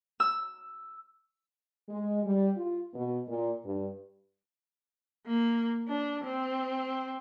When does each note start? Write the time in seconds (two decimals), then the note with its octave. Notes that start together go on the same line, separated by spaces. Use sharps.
0.20 E6
1.89 G#3
2.24 G3
2.56 F4
2.93 B2
3.28 A#2
3.64 G2
5.26 A#3
5.88 D4
6.24 C4